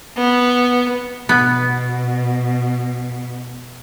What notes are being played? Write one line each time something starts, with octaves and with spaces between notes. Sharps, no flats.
B3
B2 B3